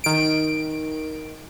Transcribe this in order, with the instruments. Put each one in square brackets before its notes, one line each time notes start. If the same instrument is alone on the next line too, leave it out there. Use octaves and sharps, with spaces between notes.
[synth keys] D#3 D7